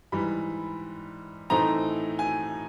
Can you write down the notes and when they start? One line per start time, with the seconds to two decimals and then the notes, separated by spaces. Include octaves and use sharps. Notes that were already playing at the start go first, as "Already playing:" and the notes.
0.12 G#2 E3 G3 B5
1.50 A2 E3 A3 C4 D#4 A#5
2.19 G#5